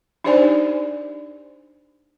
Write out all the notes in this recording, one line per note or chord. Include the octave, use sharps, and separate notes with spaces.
D4 D#4 G4 C5 D5 G#5